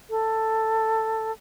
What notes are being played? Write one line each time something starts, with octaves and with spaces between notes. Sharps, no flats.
A4